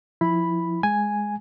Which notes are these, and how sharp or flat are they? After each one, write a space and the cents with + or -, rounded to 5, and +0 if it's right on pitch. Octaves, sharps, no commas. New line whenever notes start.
F3 +0 E4 +0 B5 +0
G#3 +0 G#5 +0